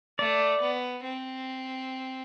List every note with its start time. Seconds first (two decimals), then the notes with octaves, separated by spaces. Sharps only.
0.18 A3 D5
0.60 B3
1.03 C4